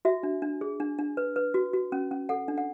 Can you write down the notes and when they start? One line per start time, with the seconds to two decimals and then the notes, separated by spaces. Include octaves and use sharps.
0.05 F#4 E5
0.23 D4
0.42 D4
0.61 G#4
0.80 D4
0.99 D4
1.17 B4
1.36 B4
1.54 F#4
1.74 F#4
1.92 C#4
2.11 C#4
2.29 A4 F#5
2.48 D4
2.58 F#5